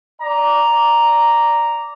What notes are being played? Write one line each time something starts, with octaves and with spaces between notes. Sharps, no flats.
D5 A#5